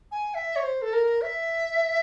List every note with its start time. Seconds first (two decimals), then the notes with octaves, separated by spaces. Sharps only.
0.11 G#5
0.34 E5
0.56 C#5
0.63 C5
0.82 A4
0.93 A#4
1.22 E5